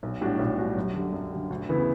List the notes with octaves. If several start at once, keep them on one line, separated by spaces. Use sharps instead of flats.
B1
A2 G3 D4 F#4
B1
A2 G3 D4 F#4
F#2
D3 G3
F#2
D3 G3
D2
C#3 E3 B3 E4